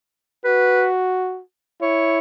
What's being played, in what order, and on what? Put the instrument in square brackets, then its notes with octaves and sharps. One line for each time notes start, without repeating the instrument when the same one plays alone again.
[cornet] F#4 [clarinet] B4
[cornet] E4 [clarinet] C#5